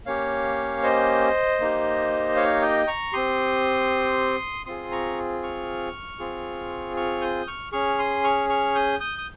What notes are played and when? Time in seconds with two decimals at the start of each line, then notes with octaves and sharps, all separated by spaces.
0.06 A#3 C#4 G4 C#5 F5
0.83 C5 D#5
1.60 A#3 D#4 G4
2.36 C#5 F5
2.62 D#5 G5
2.87 A#5 C#6
3.13 C4 G4 C6 D#6
4.66 C4 F4 G#4 C6 D#6
4.91 A#5 C#6
5.43 C#6 F6
6.19 C4 F4 G#4
6.96 C#6 F6
7.21 D#6 G6
7.47 C#6 F6
7.72 C#4 G#4 C#6 F6
7.99 C6 D#6
8.24 C#6 F6
8.49 C#6 F6
8.75 D#6 G6
9.00 D#6 G6
9.18 D#6